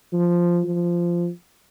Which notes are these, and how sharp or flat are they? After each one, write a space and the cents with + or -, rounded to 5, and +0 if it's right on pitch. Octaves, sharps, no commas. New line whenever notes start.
F3 -5
F3 -10